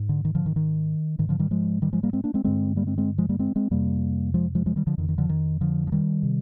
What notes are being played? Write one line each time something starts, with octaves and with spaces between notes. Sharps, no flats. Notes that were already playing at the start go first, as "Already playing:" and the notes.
Already playing: G#2
D3
D#3
D3 F3
D#3
D#3
G#2 D#3
D3 F3
D#3 G3
F3 G#3
D#3 G3
F3 G#3
G3 A#3
G#3 C4
A#3 D4
G#3 C4
G2 D3 G#3 C4
G3 A#3
G#3 C4
G#3 C4
F3 G#3
G3 A#3
G#3 C4
G#3 C4
F2 C3 G3 A#3
F3 G#3
F3 G#3
F3 G#3
D#3 G3
D3 F3
F2 D3 D#3
D#3
D3 F3
D#3
D3 F3
F3
D#3 G3
C3